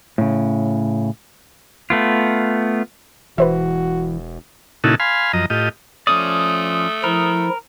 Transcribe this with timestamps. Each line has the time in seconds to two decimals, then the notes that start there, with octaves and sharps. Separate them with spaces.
0.18 A2 C#3
1.90 A3 B3 F4
3.38 E1 E3 F#4 B4 C5 E5
4.84 A#2 C#3 D#4 E4 F#4 A4
5.00 F5 G#5 B5 C6
5.33 F#2 F3 D#5 A#5
5.50 A2 F4 G4 D#5
6.07 F3 A3 C#4 D5 D#6
7.04 F3 E4 A#4